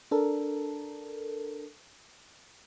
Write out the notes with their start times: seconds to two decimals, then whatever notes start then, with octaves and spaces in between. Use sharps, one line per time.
0.11 D4 A4 A#4